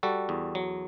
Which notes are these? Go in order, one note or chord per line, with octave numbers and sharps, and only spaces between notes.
G3 F#4 A4
E2
F#3